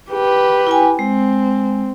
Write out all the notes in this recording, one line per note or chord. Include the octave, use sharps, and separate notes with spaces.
G4 B4
E4 G5 G#5
G#3 C4